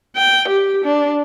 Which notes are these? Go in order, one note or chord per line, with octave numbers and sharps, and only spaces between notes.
G5
G4
D4